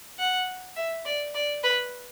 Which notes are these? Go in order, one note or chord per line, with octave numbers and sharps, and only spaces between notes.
F#5
E5
D5
D5
B4